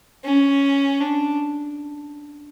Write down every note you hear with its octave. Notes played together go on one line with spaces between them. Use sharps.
C#4
D4